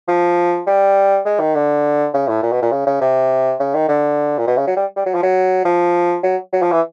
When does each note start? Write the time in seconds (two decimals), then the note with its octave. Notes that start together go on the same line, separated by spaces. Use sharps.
0.08 F3
0.67 G3
1.25 G#3
1.40 D#3
1.55 D3
2.14 C#3
2.28 A2
2.42 A#2
2.52 B2
2.62 A#2
2.71 C#3
2.86 C#3
3.01 C3
3.60 C#3
3.74 D#3
3.89 D3
4.38 A#2
4.47 B2
4.57 C#3
4.67 F#3
4.76 G3
4.96 G3
5.06 F#3
5.14 F3
5.23 F#3
5.65 F3
6.23 F#3
6.52 F#3
6.62 F3
6.72 E3